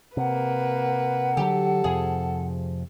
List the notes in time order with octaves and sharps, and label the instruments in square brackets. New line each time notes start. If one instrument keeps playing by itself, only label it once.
[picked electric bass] C3 [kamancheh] A#3 B4 [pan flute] F#5
[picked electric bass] D3 F3 F#3 [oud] G4 [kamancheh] A4
[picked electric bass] F2 C3 F3 [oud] G#4